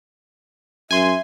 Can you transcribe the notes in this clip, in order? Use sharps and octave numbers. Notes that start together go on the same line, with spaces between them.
F#2 E5 G#5 C6